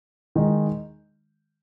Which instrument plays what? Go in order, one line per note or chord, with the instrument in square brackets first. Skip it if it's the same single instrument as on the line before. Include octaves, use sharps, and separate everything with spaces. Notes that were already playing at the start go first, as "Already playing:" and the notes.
[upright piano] D#3 G#3 D#4